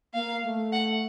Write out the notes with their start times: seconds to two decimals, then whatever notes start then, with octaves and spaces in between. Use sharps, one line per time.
0.14 A#3 F5
0.43 A3
0.72 F#5